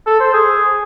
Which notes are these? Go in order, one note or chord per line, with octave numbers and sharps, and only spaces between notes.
A4
C5
G#4